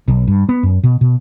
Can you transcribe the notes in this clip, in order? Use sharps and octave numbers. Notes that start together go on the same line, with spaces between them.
B1
G2
B3
F#2
B2
B2